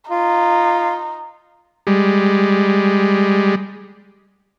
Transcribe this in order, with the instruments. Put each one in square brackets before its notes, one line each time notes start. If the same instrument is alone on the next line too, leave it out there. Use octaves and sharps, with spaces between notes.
[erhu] D#4 [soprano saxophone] F4
[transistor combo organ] G3 G#3